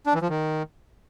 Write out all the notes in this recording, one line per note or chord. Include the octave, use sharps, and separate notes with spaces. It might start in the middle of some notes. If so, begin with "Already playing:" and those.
D4
E3
F3
D#3